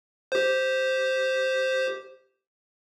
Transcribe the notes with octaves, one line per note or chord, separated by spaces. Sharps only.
G4 C5